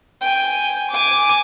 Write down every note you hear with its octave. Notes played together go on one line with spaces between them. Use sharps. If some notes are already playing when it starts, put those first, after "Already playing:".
G5 G#5
G#5 D6